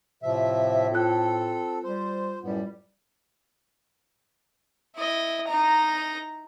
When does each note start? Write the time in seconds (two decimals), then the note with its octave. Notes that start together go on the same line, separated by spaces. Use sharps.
0.23 A2 C3 F3 E5
0.92 C4 F4 A4 F#6
1.84 G3 C5
2.43 F#2 A2 G3 B3
4.96 E4 D#5
5.48 D#4 A#5